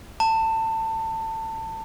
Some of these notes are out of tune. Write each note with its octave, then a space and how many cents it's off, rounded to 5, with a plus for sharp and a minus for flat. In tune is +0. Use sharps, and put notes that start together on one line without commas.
A5 +25